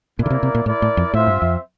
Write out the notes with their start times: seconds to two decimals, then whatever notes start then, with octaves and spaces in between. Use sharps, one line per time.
0.18 A#2 A#3 E4 A#4 D5
0.26 D3
0.30 C3
0.43 C3
0.55 A#2
0.66 A2 E4 A#4 D5
0.82 A2
0.97 F2
1.13 A2 C4 F4 C5 E5
1.27 G2
1.42 F2